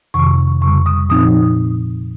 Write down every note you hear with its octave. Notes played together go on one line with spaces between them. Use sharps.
F2 C3 D#3 C#6
F2 C#3 G3 C#6
D#6
A#2 F3 C4 D#4 D#6